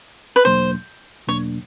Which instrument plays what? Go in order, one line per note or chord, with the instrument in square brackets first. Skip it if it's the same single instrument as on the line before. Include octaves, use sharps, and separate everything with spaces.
[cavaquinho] B4
[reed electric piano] E2 B2 F#3 A#3 D4 [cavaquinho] C5
[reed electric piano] E2 B2 F#3 A#3 D4 [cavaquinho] C#5